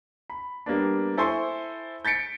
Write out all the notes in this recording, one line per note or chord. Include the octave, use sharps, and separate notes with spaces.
B5
G3 A#3 B3 D4
E4 A4 C5 G#5 C6 C#6
G6 A6 B6 C#7 D7